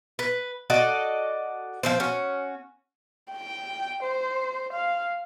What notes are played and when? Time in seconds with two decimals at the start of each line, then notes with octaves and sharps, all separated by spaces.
0.19 B4
0.70 F#4 A4 D5 D#5
1.83 F3 C4 C5
2.00 C#4 F#4
3.31 G5
4.03 C5
4.73 F5